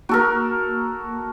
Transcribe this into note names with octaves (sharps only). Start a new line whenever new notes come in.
A#3 F#4 A4 A#4